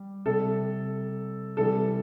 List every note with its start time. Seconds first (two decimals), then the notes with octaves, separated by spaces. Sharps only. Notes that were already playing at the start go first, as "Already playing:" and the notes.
Already playing: G3
0.26 C3 G3 A4
1.57 C3 E3 G3 A4